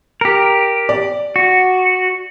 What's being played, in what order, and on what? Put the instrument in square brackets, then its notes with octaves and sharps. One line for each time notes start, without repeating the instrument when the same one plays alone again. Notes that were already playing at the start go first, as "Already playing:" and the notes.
[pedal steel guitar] G4 A#4
[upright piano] D5
[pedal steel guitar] F#4